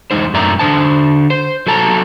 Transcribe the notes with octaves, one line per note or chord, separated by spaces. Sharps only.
E2 G#3 D#4 C5
F#2 A2 D5 E5 A#5
D3 C5 A5
C5
F#3 A4 A5 A#5